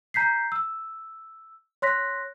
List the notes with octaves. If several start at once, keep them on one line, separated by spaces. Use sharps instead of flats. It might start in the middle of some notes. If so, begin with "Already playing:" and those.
A#5 G6 B6 C7
E6
C#5 C6 F#6 A#6 B6